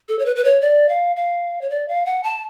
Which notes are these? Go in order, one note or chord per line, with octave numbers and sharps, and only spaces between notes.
A4
C#5
B4
B4
C#5
D5
F5
F5
C#5
D5
F5
F#5
A5